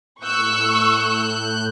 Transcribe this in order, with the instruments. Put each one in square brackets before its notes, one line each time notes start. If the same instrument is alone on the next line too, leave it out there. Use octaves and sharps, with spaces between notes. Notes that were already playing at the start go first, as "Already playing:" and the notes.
[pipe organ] A2 F#6 G6 [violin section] C#6 E6